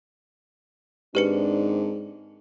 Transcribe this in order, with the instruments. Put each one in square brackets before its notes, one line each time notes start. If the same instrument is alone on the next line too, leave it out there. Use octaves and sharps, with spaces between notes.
[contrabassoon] G#2 [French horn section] D#3 C4 D4 [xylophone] G4 B4 C#7